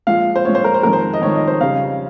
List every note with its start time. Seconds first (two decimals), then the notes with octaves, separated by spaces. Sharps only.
0.07 A#2 F3 G#3 F5
0.36 C5
0.45 A#2 F3 G#3 C#5
0.55 C5
0.64 A#4
0.74 C5
0.83 F2 D#3 G#3 A#4
0.93 C5
1.13 D#5
1.22 F2 D#3 G#3 C#5
1.35 D#5
1.47 C5
1.61 F2 C#3 G3 F5